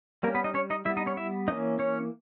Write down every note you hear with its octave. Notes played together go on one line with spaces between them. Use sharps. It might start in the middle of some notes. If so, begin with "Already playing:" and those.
G3 A#3 C#4 A#4
B3 B4
D#4 D#5
C#4 C#5
D#4 D#5
G3 B3 E4 E5
D#4 D#5
C#4 C#5
E4 E5
E3 A#3 C#4 D#4 D#5
C#4 C#5